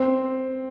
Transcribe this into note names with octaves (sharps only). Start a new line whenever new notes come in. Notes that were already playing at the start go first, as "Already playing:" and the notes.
Already playing: C4